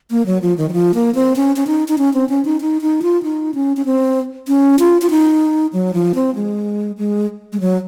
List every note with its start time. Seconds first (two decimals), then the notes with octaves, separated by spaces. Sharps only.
0.11 A#3
0.26 F#3
0.42 F3
0.58 D#3
0.69 F#3
0.73 F3
0.94 A#3
1.15 C4
1.36 C#4
1.56 C#4
1.67 D#4
1.88 D#4
1.98 C#4
2.14 C4
2.29 C#4
2.45 D#4
2.61 D#4
2.82 D#4
3.02 F4
3.23 D#4
3.54 C#4
3.77 C#4
3.86 C4
4.48 C#4
4.79 F4
5.02 F4
5.10 D#4
5.73 F#3
5.94 F3
6.15 C4
6.35 G#3
6.98 G#3
7.53 G#3
7.60 F#3